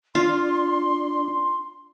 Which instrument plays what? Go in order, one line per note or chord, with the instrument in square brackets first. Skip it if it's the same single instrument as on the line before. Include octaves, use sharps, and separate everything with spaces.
[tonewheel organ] D4 [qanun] F4 [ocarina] C6